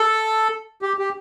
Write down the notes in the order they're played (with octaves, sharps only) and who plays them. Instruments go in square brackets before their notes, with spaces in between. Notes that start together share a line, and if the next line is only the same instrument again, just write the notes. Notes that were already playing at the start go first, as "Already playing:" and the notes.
Already playing: [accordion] A4
G4
G4